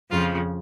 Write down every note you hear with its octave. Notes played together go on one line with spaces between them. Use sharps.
F2 C#3 F3 F4